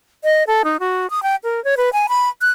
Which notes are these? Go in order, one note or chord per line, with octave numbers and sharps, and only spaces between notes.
D#5
A4
D#4
F#4
D#6
G5
A#4
C#5
B4
G#5
B5
F#6